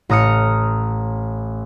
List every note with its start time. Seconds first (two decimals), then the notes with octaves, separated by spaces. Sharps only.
0.09 A1 A#5 D#6 F6 C#7